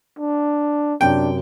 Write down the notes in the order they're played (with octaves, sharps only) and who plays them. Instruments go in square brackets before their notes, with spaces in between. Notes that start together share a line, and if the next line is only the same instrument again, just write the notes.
[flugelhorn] D4
[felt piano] F#2 C3 [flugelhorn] D4 [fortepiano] G5